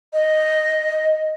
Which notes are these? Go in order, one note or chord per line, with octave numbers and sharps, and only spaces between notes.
D#5